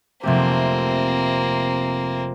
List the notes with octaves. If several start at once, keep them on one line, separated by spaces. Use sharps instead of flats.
F1 A3 A#3 C4 G4